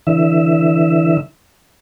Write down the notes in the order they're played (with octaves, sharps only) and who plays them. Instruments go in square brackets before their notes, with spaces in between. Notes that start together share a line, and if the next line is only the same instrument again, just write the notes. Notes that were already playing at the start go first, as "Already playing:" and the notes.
[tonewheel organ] D3 E3 E5